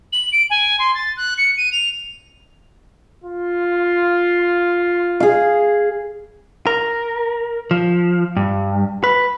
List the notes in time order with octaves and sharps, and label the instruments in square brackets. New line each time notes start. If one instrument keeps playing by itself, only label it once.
[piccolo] F#7
D7
G#5
C6
A6
F#6
C#7
D#7
F7
[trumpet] F4
[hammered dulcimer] G#4 F5
[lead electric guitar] A#4
F3
G2
B4